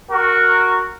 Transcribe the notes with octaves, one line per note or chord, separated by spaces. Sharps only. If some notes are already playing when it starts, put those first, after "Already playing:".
F#4 A#4